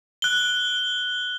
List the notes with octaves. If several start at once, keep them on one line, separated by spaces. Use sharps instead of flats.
F#6 G7